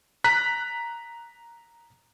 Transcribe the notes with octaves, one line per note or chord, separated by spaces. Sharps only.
A#5 F#6 B6